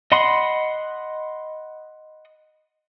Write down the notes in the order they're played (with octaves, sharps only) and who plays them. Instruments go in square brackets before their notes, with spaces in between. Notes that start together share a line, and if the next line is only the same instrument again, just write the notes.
[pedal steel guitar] D#5 F#5 B5 C6